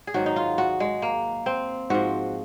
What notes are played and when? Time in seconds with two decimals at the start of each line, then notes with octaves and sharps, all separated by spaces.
0.07 G#4
0.14 G#2 D#3 F#3 F#4
0.26 D#4
0.36 F4
0.58 F#4
0.80 G#3
1.02 A#3
1.46 C4
1.90 G#2 F3 F#4